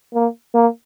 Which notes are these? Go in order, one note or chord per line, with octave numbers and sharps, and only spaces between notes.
A#3
A#3